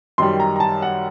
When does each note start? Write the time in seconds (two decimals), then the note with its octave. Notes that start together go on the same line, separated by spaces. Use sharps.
0.18 F#2 D#3 G3 C6
0.40 A#5
0.56 A#5
0.60 A5
0.82 F#5